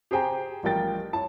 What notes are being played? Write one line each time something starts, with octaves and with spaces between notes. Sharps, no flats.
G4 G#4 C5 G5 G#5 A#5
A1 F3 G3 A#4 G5 A6
E4 C#5 A5